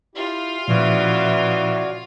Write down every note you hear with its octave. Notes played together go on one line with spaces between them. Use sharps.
E4 F4 G4 F5
A#2 C#3 E3 F3 F#4 C#5 D5